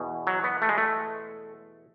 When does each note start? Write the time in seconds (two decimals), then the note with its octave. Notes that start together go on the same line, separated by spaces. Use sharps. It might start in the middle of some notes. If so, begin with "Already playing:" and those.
Already playing: E2 B2
0.27 F#3
0.44 B3
0.62 A3
0.69 G#3
0.78 A3